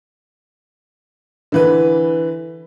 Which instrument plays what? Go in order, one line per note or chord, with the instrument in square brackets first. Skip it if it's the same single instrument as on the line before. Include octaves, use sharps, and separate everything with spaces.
[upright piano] D3 E3 B4